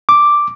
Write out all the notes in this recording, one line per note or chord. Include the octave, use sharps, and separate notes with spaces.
D6